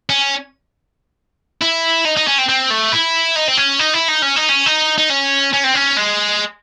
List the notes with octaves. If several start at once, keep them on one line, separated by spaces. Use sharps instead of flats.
C#4
E4
D#4
D#4
C#4
C4
C4
A3
E4
D#4
C4
C#4
D#4
E4
D#4
C#4
D#4
C#4
D#4
D#4
C#4
C#4
C4
C#4
G#3